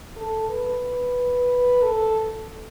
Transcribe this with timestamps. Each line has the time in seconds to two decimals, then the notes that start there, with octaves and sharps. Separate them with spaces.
0.16 A4
0.49 B4
1.82 A4